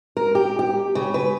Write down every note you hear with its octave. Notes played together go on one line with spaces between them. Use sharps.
A#4
G4
G4
C#3
B4